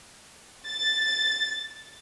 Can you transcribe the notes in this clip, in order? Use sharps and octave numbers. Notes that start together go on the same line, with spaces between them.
A6